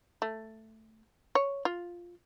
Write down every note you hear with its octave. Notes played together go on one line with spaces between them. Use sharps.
A3
C#5
F4